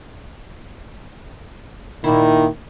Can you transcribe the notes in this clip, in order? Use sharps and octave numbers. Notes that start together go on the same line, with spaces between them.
A#2 D#3 E4